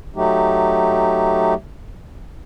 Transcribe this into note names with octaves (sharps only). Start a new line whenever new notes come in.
F#3 A3 D#4 G4